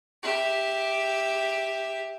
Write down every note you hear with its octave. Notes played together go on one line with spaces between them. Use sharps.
G4 E5